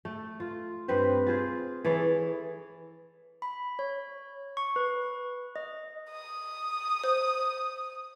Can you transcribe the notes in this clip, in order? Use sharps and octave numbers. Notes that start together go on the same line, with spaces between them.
A3
F4
G2 C4 B4 C5
F4 G#4 C5
E3 G#4 A4 C#5
B5
C#5
C#6
B4
D#5
D#6
C5